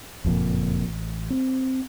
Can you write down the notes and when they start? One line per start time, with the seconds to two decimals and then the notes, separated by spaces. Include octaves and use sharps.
0.25 F#1 F2 A#2 C#3
0.87 A1
1.30 C4